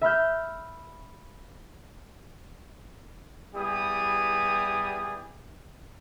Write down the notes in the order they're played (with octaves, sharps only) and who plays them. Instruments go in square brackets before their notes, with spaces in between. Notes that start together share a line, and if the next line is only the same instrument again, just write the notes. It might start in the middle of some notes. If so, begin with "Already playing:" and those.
[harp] E5 B5 F6 G6
[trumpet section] G3 B3 E4 G4 G#4 D#6